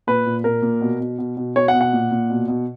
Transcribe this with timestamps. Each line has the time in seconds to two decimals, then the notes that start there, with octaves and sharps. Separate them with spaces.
0.07 A#2 B4
0.26 A#2
0.44 A#2 A#4
0.62 A#2
0.81 B2
1.00 B2
1.18 B2
1.37 B2
1.56 B2 C#5
1.68 F#5
1.73 B2
1.81 F#5
1.93 A#2
2.11 A#2
2.30 B2
2.48 B2